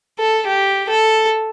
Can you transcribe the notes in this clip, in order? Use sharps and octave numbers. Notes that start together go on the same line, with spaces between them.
A4
G4
A4